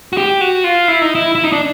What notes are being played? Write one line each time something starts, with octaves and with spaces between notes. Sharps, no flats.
F#4
G4
F#4
F4
E4
D#4
E4
E4
D#4
D4